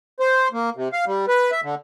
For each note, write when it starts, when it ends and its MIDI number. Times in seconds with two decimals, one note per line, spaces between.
0.20 0.48 72
0.53 0.70 58
0.76 0.88 48
0.93 1.05 77
1.06 1.26 55
1.28 1.51 71
1.52 1.61 76
1.63 1.75 50